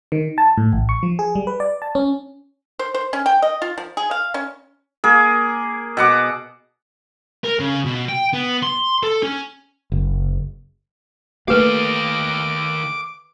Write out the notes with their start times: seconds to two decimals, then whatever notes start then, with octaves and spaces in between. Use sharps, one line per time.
0.12 D#3
0.38 A5
0.58 A2
0.73 A1
0.89 C#6
1.03 F3
1.19 G#4
1.35 G3
1.47 B4
1.60 D5
1.82 A5
1.95 C#4
2.79 C5
2.94 C5
3.13 C#4
3.26 G5
3.42 D#5
3.62 F4
3.78 F3
3.97 G#4
4.11 F5
4.34 C#4
5.04 A#3 G#4
5.97 B2 F#5 D6
7.44 A#4
7.60 C#3
7.85 B2
8.08 G5
8.33 B3
8.63 C6
9.03 A4
9.23 C#4
9.92 F#1
11.48 D#3 A3 A#3 G4 B4 F5 D6